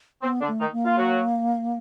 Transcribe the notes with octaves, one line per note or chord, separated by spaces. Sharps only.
B3 C4
D3 D4
A3
D#3 D#4
A#3
F4
F#3 F#4